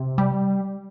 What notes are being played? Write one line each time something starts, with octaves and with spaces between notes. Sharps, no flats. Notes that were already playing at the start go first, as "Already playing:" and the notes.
Already playing: C3
G3